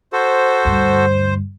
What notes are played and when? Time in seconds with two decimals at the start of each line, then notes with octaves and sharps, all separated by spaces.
0.13 F#4 A4 C5
0.65 D2 G2